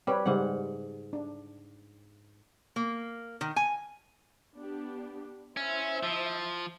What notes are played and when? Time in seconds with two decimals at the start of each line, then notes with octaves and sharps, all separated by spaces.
0.07 G3 C4 B4 C#5
0.26 G#2 C#3 G3 C4 F#5
1.13 D4
2.76 A#3
3.41 D#3
3.56 G#5
4.56 B3 D4 G4
5.57 C#4 E4 C5 E5
6.03 F3